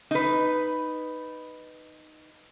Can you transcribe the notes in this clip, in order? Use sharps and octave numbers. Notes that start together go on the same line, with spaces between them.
D#4 B4